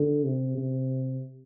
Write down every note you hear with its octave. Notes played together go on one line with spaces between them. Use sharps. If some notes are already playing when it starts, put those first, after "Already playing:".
Already playing: D3
C3
C3